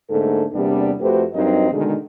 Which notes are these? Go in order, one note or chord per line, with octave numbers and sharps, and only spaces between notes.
G#2 D3 A3 A#3 A4
E2 C3 G3 A#3 B3 D4
F2 A3 F#4 G4 B4 C5
G2 F#3 C4 D#4 A#4 D#5
B2 D3 D#3 G#3